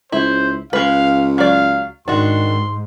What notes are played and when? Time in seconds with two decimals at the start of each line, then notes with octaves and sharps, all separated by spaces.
0.12 C#2 E4 C5
0.73 C#2 G#3 B4 F5
1.38 F#3 D5 F5
2.08 G#2 D#3 D4 F#4 C6